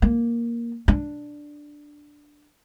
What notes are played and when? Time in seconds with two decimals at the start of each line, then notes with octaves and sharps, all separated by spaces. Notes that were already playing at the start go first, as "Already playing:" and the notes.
0.02 A#3
0.88 D4